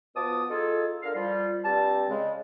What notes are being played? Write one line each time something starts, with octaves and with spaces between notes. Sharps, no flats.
B2 F3 B3 A5 D6 D#6
D#4 F4 G#4 A4
D3 A#4 F5
F3 G3 F4
G2 G3 C4 A5
C#3 G#3